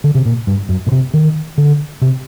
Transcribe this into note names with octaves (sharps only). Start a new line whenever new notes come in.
D3
C3
A#2
G2
F#2
A#2
C3
D#3
D3
C3